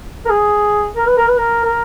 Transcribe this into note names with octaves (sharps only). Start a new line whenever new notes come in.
A#4
G#4
A#4
B4
A#4
B4
A#4
A#4